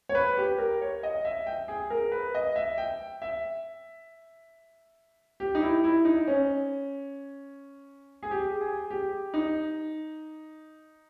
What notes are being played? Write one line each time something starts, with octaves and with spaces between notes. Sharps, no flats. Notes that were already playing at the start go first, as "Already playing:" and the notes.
C#5
B4
G4
A#4
C#5
D#5
E5
G5
G#4
A#4
B4
D#5
E5
G5
E5
G4
D#4
E4
E4
D#4
C#4
G#4
G4
G#4
G4
D#4